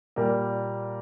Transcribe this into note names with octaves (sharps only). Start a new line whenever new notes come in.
A#2 G3 A#3